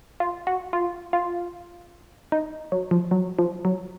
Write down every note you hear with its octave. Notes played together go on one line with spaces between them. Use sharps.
F4
F#4
F4
F4
D#4
F#3
F3
F#3
F3
F#3